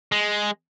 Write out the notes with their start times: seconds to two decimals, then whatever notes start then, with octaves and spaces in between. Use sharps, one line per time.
0.12 G#3